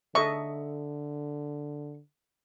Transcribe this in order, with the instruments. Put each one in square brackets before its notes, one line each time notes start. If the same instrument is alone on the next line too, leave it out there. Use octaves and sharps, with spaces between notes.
[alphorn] D3 [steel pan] A4 D#5 E5 [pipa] C#6